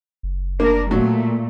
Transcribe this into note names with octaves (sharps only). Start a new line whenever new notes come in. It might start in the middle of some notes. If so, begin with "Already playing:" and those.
F#1
A#3 D4 A#4
A#2 F#3 A3